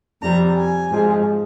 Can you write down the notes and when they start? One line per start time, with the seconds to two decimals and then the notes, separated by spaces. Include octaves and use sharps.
0.22 F2 C3 G3 A#5
0.56 G#5
0.89 G#2 F3 G#3